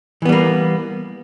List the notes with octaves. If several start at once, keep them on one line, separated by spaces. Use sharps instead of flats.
E3 G3 A#3 B3